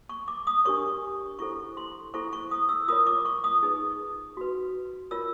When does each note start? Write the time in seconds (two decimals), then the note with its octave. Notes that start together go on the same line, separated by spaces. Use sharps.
0.09 C#6
0.28 D6
0.47 D#6
0.65 D4 G4 A#4 C#5 C#6
1.39 E4 A4 C5 C#6
1.77 C6
2.14 E4 A4 C5 C#6
2.33 C#6
2.51 D#6
2.69 E6
2.88 F4 A#4 C#5 D#6
3.07 D6
3.25 C#6
3.44 D#6
3.63 D#4 G#4 B4
4.37 F#4 B4
5.11 F4 A#4 C#5 E6